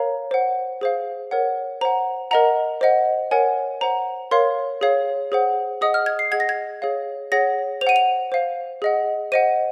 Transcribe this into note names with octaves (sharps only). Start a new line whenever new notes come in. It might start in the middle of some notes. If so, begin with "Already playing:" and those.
Already playing: A#4 C#5 F5 A#5
C5 F#5
G#4 C5 F5
A#4 C#5 F#5
C5 F#5 A#5
A#4 D#5 F#5 A#5
C5 D#5 F#5
A#4 C#5 F#5 G#5
C5 F#5 A#5
A#4 C#5 F5 C6
G#4 C#5 F5
G#4 C5 F#5
G#4 D#5 F#5 D#6
F6
G#6
C7
G#4 D#5 F#5 G#6
A#6
G#6
G#4 C#5 F5
G#4 C#5 F#5 A#6
C5 F7
F#5 D#7
F7
C5 F5
G#4 D#5 F#5
C5 D#5 F#5 D#7